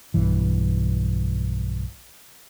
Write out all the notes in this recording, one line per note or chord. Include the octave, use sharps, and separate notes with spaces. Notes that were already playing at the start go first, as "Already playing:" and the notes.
B1 G2 E3